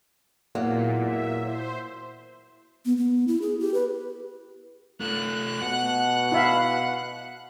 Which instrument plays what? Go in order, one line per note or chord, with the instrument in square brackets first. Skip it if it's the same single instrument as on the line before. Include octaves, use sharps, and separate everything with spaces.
[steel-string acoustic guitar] E2 F#3 A#3 [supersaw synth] A#2
[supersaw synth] E5
C5
[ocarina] B3
B3
E4
G#4
G4
B4
[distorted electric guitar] A3 F4 [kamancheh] F#6
[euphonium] B2 [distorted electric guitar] F#5
[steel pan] E4 E5 F5